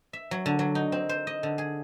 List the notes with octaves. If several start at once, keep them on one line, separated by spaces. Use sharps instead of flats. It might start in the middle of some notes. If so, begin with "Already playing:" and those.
E5
F#3
D3
F#3
D#4
C4
C5
D#5
D3
G#4